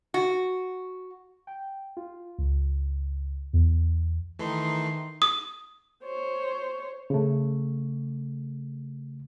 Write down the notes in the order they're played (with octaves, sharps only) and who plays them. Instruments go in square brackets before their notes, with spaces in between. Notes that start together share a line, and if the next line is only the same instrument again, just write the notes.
[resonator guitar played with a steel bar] F#4
[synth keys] G5
F4
C#2
E2
[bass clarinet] D#3 [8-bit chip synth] E3 A3 [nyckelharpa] D#4 C6
[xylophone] D#6
[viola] C5 C#5
[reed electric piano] C#3 A3